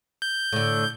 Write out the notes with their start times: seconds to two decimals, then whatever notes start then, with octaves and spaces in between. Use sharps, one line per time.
0.22 G6
0.53 A2 D3